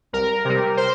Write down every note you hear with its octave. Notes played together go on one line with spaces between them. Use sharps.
C2 A#4
C3 G3
C5